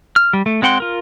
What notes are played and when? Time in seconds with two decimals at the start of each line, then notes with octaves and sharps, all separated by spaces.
0.16 F6
0.33 G3
0.46 A3
0.62 G#3 C4 F#5 G5 C6
0.80 F4 A#4